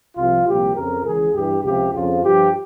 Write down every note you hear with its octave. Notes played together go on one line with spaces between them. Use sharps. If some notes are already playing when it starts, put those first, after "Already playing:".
C2 C3 F3 F4
C2 A#2 F3 G4
F2 C#3 F3 A#4
C#2 C#3 E3 G#4
G2 E3 G4
C#2 C3 F3 G4
F2 C#3 F3 F4
G2 F3 G4